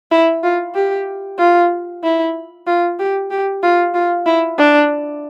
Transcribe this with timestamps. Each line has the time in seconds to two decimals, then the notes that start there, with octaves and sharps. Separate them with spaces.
0.11 E4
0.43 F4
0.75 G4
1.39 F4
2.03 E4
2.67 F4
2.99 G4
3.31 G4
3.63 F4
3.95 F4
4.26 E4
4.58 D4